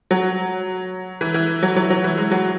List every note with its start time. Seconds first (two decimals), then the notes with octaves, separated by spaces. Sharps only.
0.11 F#3
1.21 E3
1.34 E3
1.63 F#3
1.76 F#3
1.90 F#3
2.04 E3
2.18 G#3
2.31 F#3